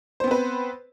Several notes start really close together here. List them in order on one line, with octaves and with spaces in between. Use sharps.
C5 B3 C4 B4